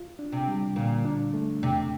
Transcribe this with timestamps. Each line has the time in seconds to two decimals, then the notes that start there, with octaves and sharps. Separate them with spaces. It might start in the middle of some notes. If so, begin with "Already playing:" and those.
Already playing: F4
0.19 D4
0.32 C3
0.48 G3
0.76 A#2 D3
1.05 D4
1.34 A3
1.62 E2 C3